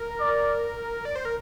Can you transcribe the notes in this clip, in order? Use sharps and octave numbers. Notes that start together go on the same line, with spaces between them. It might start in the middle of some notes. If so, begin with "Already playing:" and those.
Already playing: A#4
D5
D5
C5
A#4